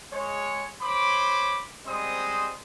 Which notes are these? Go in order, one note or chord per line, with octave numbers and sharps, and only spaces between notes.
G#3 C#5
C5 C#5 B5 D6
G3 G#3 C4 C5 D#5 D#6